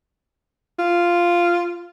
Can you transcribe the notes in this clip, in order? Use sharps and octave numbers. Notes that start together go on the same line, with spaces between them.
F4